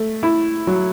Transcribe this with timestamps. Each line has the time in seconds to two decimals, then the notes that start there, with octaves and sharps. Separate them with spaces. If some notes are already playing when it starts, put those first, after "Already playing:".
Already playing: A3
0.23 E4
0.67 F#3